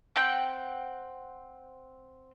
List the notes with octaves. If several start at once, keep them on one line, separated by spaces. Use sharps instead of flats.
C4 F#5 G5 G6